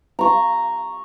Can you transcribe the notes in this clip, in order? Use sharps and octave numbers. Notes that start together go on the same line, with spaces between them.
A#5 C#6